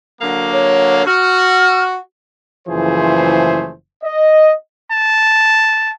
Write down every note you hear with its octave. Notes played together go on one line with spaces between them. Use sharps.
D3 F#3 A#3
C#5
F#4 F6
F#1 E3 F3 A3 G#4 C5
D#5
A5